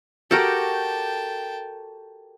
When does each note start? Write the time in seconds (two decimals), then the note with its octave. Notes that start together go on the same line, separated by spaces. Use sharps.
0.31 F#4 G4 A4 A#4 G5 A5